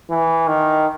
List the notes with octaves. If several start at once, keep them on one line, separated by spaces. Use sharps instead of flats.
E3
D#3